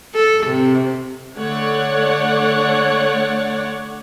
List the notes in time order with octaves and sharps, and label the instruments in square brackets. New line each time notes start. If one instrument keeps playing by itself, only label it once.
[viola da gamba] A4
C3
[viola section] D3 A3 C#5 D5 F#5